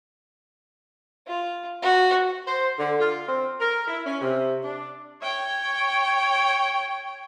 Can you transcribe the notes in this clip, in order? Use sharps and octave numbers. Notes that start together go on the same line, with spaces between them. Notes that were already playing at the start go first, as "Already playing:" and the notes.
F4
F#4
C5
D3
F4
C4
A#4
E4
C#4
C3
D4
C#5 G5